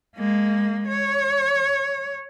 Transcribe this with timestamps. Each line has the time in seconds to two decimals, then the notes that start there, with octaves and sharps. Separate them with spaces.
0.17 G#3 A#3
0.87 C#5